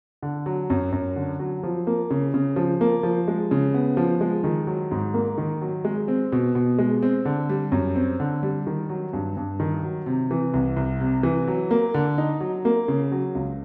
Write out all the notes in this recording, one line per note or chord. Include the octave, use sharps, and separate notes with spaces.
D3
F#3
F#2
F#2
D3
F#3
F3
A#3
C#3
C#3
F3
A#3
F3
G#3
C#3
B3
F3
G#3
D#3
F#3
G#2
A#3
D#3
F#3
G#3
C4
B2
B2
G#3
C4
D3
G3
F#2
C4
D3
G3
D#3
F#3
G2
G2
D#3
F#3
C3
E3
C2
C2
C3
E3
F#3
A#3
D3
D#4
F#3
A#3
C#3
F#3
C#2